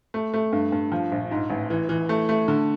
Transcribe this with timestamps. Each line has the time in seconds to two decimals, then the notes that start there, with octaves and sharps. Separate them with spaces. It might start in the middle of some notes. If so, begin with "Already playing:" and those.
0.14 A3
0.34 A3
0.53 G2
0.72 G2
0.92 F3
1.12 A#1
1.31 G#2
1.50 A1
1.70 E3
1.89 E3
2.09 A3
2.29 A3
2.48 D3